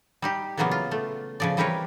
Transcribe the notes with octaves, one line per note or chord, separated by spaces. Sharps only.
G3 D#4 G4
A#2 C#3 E3 F#3 A#3 B3
F4
A3
C#3 F3 D5
E3 G3 C4 A#4 B4 C#5